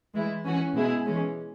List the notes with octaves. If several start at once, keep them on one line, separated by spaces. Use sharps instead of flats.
E3 G#3 E4
E3 C#4 F#4
B2 G#3 E4 G#4
E3 G#3 C#4